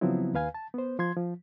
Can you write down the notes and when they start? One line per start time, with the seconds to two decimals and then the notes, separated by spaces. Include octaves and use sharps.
0.01 C#3 F3 F#3 B3 C4 E4
0.34 D#2 B4 F5 G#5
0.55 A5
0.74 B3 C5
0.99 F3 C6 G#6
1.17 F3